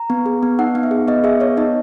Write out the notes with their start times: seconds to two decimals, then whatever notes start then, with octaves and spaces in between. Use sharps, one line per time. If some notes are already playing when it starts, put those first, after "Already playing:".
Already playing: A#5
0.10 B3
0.26 G#4
0.43 B3
0.59 D#4 F#5
0.75 B3
0.83 E5
0.91 G#4
1.08 B3 D#5
1.24 G#4 E5
1.40 B3 C#5
1.57 D#4 D#5